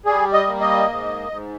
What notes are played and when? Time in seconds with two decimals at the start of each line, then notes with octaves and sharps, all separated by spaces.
0.05 G3 G#4
0.33 D#5
0.47 A#3
0.61 D#5
0.88 G#2
1.30 G#2